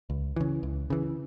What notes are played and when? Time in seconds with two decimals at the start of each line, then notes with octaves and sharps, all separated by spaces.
0.10 C#2
0.36 C#3 E3
0.63 C#2
0.90 C#3 E3